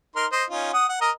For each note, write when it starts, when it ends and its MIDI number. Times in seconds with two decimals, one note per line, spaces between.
0.16 0.26 63
0.16 0.26 70
0.16 0.26 84
0.32 0.44 72
0.32 0.44 75
0.50 0.73 61
0.50 0.73 63
0.50 0.73 65
0.73 0.86 78
0.73 0.86 87
0.89 0.97 78
1.01 1.10 70
1.01 1.10 75
1.01 1.10 82